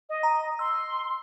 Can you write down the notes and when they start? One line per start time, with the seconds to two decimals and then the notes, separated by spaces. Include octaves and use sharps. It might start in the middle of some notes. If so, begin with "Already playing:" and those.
0.09 D#5
0.23 A#5
0.59 C6 E6